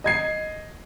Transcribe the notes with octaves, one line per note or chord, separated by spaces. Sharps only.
D#5 G#6 C7